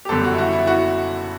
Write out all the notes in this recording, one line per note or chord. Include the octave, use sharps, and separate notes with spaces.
G4
F#1 E2 D3 G3 A4
F#4
E4
F#4
E4
F#4